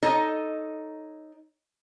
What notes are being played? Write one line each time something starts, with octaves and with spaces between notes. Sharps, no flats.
D#4 A4 C#5 D#5